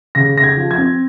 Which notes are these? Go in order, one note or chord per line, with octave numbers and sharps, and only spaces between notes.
C#3 A#6
C#3 A#6
G#6
F3
G#6
C4